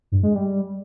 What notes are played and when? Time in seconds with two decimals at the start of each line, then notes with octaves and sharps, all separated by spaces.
0.12 G2
0.23 G#3
0.35 G3